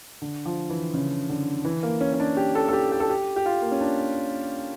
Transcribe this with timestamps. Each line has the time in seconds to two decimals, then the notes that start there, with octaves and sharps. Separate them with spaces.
0.22 D3
0.45 F3
0.70 E3
0.93 C#3
1.29 D3
1.65 E3
1.83 A#3
2.01 C#4
2.13 C#4
2.20 D4
2.37 G4
2.55 A4
2.68 A4
2.73 G4
2.92 G4
3.00 A4
3.10 G4
3.36 G4
3.46 F4
3.62 A#3
3.72 C#4
3.81 D4